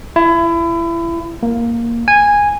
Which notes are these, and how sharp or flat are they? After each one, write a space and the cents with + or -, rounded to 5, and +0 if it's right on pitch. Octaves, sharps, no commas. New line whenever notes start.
E4 +30
A#3 +0
G#5 -10